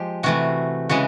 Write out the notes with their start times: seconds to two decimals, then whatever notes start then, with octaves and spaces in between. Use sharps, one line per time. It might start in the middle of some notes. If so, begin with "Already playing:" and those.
Already playing: F3 G#3 G4
0.23 C3 E3 A3 F#4
0.89 C#3 E3 G#3 F#4